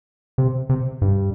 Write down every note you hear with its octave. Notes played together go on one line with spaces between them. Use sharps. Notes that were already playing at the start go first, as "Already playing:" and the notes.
C3
C3
G2